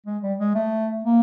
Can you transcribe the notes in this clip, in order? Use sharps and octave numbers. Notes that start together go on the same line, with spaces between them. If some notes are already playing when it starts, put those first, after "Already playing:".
G#3
G3
G#3
A3
A#3